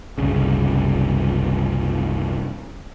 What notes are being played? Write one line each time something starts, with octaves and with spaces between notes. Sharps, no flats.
F#1 C2 C#3